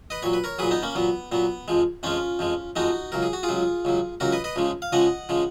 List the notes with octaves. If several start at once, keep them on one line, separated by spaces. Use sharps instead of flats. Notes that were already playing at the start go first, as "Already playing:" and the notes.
B4 D#5
A#2 F#3 C#5
B4
A#4 C#5
A#2 F#3 G#4 B4
B3 D#4
A#3 C#4
A#2 F#3 B3
A#2 F#3 B3
F2 F3 G#3
F2 F3 G#3 C#4 F4
F2 F3 G#3
F2 F3 G#3 D#4 F#4
C#2 C#3 F#3 A#4
G#4
F#4
F4 G#4
C#2 C#3 F#3
C#2 C#3 F#3
C#2 C#3 F#3 F#4 A#4
B4 D#5
B4 D#5
C#2 C#3 F3 G#3
F5
C#2 C#3 F3 G#3 D#5 F#5
C#3 F3 G#3